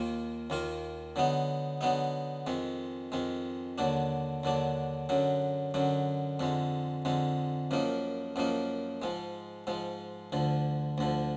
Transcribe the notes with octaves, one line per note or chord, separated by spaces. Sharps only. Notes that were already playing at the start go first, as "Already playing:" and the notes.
Already playing: D#2 D#3 A#3 F4
D#2 D#3 A#3 F4
D3 F#3 B3 D#4
D3 F#3 B3 D#4
F2 D#3 G#3
F2 D#3 G#3
D#2 D3 F#3 D4
D#2 D3 F#3 D4
F#2 D3 F#3
F#2 D3 F#3
F2 D3 G#3
F2 D3 G#3
F#2 F3 A#3 D#4
F#2 F3 A#3 D#4
G#2 F3 G#3
G#2 F3 G#3
D2 D3 F3
D2 D3 F3